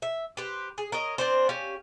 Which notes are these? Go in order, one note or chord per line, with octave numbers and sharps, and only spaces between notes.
E5
G4 B4 C5
G#4
A#4 C#5 D#5
C4 D4 C5
C#4 G4 F5 G#5